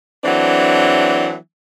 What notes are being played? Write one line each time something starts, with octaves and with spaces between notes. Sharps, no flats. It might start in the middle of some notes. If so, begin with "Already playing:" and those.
E3 F#3 A3 C4 D4